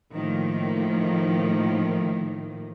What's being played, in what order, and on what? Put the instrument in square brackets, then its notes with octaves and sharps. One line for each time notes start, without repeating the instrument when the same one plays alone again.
[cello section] A2 D#3 F3 A#3